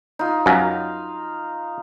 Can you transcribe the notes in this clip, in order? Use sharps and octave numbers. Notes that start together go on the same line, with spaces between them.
D#4 F4
F#2 F5